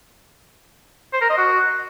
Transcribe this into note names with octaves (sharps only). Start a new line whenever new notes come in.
C5
A#4
D#5
F#4